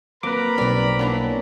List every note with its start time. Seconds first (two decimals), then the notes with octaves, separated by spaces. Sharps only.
0.23 F#3 A#3 C4 A#4 B4 A#5 B5 D6
0.58 B1 G3 C4 B4 D5
0.99 A#3 B3 C#4 D4 E4